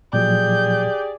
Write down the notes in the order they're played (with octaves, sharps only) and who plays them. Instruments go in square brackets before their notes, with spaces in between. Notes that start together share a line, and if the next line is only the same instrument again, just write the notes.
[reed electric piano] A#2 F3 F#3 [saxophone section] G4 G#4 D5 [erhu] G6